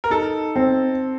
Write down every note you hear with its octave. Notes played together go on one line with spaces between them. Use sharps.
A#4
D#4 A4
C4